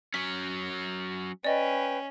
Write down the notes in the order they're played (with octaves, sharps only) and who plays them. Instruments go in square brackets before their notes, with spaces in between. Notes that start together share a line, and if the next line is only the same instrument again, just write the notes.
[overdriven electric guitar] F#3 C#4 [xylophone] B6
[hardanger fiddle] C#4 [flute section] B4 G5 [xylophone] D5 D#5